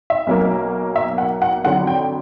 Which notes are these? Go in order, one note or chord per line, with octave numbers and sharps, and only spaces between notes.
E5
B1 B2 F#3 A#3
E5
F#5
F#5
F2 D3 F#3 F#5
G5